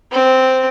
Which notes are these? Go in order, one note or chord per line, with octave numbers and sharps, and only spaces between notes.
C4